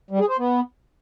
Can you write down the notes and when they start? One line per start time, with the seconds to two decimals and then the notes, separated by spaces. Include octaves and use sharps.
0.10 G3
0.20 G#4
0.29 C5
0.38 B3